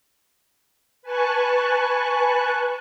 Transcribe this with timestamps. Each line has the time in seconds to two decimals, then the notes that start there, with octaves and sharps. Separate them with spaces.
1.02 B4 G#5 A5 C#6 F#6